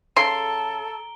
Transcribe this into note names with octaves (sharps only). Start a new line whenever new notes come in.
C#3 A4 A#5 C6 D7 G7